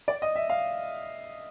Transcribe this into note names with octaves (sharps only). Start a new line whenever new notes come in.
D5
D#5
E5
F5